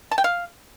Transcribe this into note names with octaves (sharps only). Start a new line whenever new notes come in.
A5
G5
F5